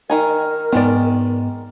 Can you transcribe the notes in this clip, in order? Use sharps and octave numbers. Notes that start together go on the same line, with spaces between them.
D#3 D#4 A#4 G#5
G#2 D#3 G#3 B3 D5